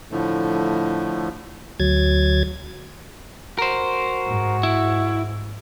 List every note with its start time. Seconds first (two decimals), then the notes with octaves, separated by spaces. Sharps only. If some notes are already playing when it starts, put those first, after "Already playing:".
0.12 A2 D3 F3 A3
1.80 D2 F#3 G#6 A6
3.59 F#4 A#4 C5
4.25 G#2
4.63 E4